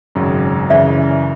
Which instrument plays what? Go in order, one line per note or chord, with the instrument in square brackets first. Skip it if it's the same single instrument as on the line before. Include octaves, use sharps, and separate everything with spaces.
[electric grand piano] G#1 F#2 C#3 F#3
[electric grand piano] F#2 C#3 E3 [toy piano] D5 E5